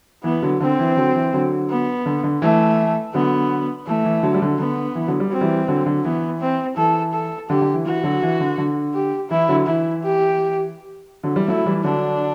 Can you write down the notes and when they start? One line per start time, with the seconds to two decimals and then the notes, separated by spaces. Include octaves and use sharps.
0.24 E3 B3
0.42 D3 F#3
0.60 D3 C4
0.79 E3
0.97 D3 F#3
1.15 E3
1.33 D3 F#3
1.70 B3
2.06 D3
2.23 D3
2.42 E3 A3
3.14 D3 F#3 B3
3.87 E3 A3
4.05 E3
4.23 D3 F#3
4.34 G3
4.41 D3 F#3
4.59 D3 B3
4.95 E3
5.07 D3 F#3
5.20 G3
5.30 F#3 C4
5.41 E3 G3
5.68 D3 F#3
5.86 D3 F#3
6.04 E3 B3
6.40 C4
6.77 E3 A4
7.14 A4
7.49 D3 G4
7.61 D3
7.74 E3
7.85 E3 F#4
8.04 D3 F#3
8.22 E3
8.40 D3
8.58 D3
8.94 G4
9.30 E3 E4
9.48 D3 F#3
9.67 E3 E4
10.03 G4
11.23 D3 F#3
11.36 E3 G3
11.48 F#3 A3 E4
11.66 E3 G3
11.84 D3 F#3 D4